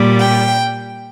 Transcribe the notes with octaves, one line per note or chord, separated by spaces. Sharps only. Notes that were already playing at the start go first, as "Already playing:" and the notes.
Already playing: A#2 G3
G5